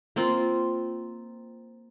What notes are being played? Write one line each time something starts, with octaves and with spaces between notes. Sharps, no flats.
A#3 C4 F4